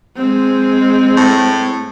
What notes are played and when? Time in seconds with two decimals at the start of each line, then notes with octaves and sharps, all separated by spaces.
0.17 G#3 C4
1.17 A2